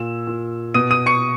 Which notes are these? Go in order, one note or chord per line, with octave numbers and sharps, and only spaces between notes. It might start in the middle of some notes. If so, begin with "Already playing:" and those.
Already playing: A#2 E6 E7
A#2
B2 D#6 D#7
D#6 D#7
C#6 C#7